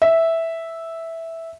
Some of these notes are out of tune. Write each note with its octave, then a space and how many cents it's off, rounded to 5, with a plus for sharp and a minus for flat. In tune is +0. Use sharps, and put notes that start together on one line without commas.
E5 -5